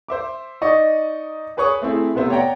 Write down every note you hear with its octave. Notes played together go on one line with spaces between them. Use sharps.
C5 E5 D6
D#4 D5 D#5 C#6
G#4 B4 C#5 C#6 D#6
A3 C4 E4 G#4
C3 A3 B3 C5 E5
C#5 D5 F#5 G5 A#5